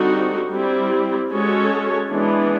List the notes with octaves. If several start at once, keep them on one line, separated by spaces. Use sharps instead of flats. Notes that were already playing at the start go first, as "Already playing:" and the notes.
Already playing: D3 G3 C4 D#4 F#4
G3 C4 E4
G#3 C#4 F#4 A4 C#5
E3 G#3 B3 D4